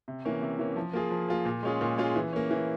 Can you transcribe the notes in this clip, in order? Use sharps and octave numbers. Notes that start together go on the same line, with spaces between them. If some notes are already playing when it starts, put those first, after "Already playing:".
C3
E3 A#3 C#4
C3
E3 A#3 C#4
F3
A#3 F4 G#4
F3
A#3 F4 G#4
A#2
G#3 C#4 F4 G#4
A#2
G#3 C#4 F4 G#4
E3
A#3 C#4
E3